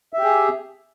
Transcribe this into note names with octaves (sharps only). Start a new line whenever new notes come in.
G4 G#4 E5